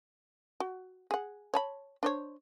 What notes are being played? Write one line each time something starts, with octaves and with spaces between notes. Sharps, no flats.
F#4
G#4 F#5
C#5 A5 B5
D4 C5 C#5